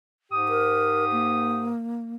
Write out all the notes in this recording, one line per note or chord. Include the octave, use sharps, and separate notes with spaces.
G#2 G4 D#6
A#4
A#3